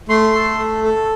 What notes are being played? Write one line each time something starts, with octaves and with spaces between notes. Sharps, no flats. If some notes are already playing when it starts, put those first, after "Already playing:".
A3 C6
A4
A3
A4